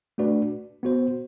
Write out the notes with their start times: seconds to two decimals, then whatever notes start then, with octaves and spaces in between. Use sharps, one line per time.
0.18 A3 D4 F#4 B4 D5
0.83 B3 F#4 C5